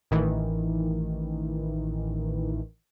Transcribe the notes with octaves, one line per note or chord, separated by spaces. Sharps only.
A1 D#3 E3